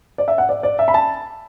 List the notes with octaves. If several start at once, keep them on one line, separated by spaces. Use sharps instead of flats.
D5
E5
F#5
D5
D5
E5
B5
A5